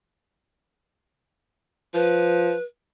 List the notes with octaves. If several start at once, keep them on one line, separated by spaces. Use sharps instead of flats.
F3 B4